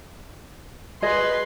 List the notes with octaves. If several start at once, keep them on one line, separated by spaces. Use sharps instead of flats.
G#4 B4 D#5 C6